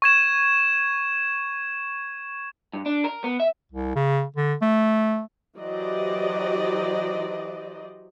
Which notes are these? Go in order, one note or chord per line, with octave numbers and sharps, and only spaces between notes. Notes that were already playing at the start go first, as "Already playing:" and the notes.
C#6 G#6 E7
G2
D4
A#4
B3
E5
C2
C#3
D3
A3
E3 F#3 G4 C5 D5 D#5